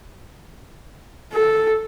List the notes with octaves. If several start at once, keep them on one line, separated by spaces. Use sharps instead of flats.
A4